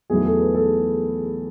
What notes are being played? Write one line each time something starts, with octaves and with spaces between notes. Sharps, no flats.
E2 D#3 F#3 A3 G#4
A4
B4
A4